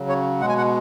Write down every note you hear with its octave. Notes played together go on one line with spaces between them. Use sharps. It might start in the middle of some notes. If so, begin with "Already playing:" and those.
Already playing: C#3 F#3
C#5
B2 G#3 F#5
G#5
F#5